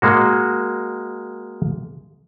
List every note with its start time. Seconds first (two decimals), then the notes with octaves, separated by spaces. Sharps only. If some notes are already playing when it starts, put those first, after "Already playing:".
0.02 G#3 A#3 F#4